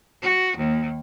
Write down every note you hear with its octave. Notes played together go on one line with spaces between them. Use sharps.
F#4
D#2